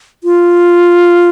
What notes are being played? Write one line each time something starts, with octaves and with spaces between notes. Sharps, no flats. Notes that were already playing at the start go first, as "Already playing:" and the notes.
F4